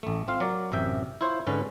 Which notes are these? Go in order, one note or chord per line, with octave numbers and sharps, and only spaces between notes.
A1 A3
C4 F4 F5
F#3 A#4 D5
A1 F#2 C3 E5 G5
E4 F4 C5 C#5
G#2 D3 C#4 B4